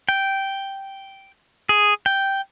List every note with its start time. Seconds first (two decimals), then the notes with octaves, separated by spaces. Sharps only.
0.09 G5
1.69 G#4
2.06 G5